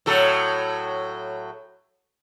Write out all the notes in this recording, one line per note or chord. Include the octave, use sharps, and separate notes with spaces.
A2 F#3 A4